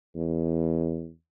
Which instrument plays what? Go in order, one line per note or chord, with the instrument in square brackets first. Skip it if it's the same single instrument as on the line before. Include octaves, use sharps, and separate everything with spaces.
[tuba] E2